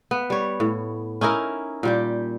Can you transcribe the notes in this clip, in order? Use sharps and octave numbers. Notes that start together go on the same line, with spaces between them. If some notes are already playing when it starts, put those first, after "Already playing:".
B3
G3 C#5
A2
C#4 D#4 E4 A#4
A#2 G3 G4